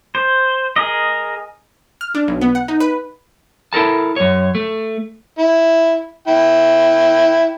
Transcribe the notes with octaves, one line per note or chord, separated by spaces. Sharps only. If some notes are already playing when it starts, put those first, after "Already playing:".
C5
G#4 A#4 D#5
F6
D4
B1
B3
F#5
D#4
B4
E4 A4 A#4 A5
F#2 C#5
A3
E4
E4 G5